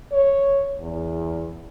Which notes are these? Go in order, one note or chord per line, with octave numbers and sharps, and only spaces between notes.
C#5
E2